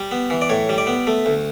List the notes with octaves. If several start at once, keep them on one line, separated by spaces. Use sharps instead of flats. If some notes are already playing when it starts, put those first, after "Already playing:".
Already playing: G3
B3
E3
D5
A2 C#5
G3
D5
B3
A3
D2